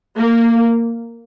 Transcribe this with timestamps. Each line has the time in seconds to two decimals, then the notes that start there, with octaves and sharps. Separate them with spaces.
0.17 A#3